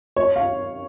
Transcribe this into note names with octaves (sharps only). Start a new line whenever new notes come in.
C#5
F5